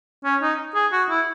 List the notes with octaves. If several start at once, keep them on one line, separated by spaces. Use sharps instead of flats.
C#4
D#4
G#4
F#4
E4